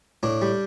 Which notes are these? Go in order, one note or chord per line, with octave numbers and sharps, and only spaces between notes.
A2 D4
G3